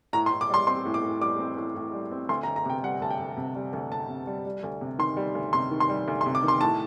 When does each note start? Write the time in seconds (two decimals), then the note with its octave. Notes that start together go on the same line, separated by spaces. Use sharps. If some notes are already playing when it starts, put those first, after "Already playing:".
0.13 A2 A#5
0.26 C6
0.32 A2
0.41 D6
0.50 G3 C6
0.67 C4 C6
0.85 A2
0.94 D6
1.03 A2
1.21 G3 D6
1.39 C4
1.57 A2
1.75 A2
1.93 G3
2.11 C4
2.29 D2 C6
2.43 A#5
2.48 D2
2.56 A#5
2.65 C3 G5
2.83 G3 F#5
3.01 D2 A5
3.10 G5
3.20 D2
3.37 C3
3.55 G3
3.73 D2
3.91 D2 A5
4.09 C3
4.27 G3
4.46 G3
4.64 D2
4.81 C3
4.99 D#3 C6
5.17 G3
5.35 D2
5.53 C3 C6
5.71 D#3
5.80 C6
5.89 G3
6.08 D2
6.21 C6
6.26 C3
6.35 D6
6.43 D#3 C6
6.61 A2 A5